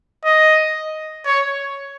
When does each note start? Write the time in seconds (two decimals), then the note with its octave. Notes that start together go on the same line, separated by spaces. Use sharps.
0.25 D#5
1.26 C#5